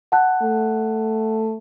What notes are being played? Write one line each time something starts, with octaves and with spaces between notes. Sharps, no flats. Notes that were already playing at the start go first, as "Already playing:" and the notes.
F#5 A5 F#6
A3